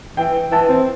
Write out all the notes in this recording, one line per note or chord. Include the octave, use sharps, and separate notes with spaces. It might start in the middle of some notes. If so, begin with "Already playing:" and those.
E3 G5
E3 A5
C4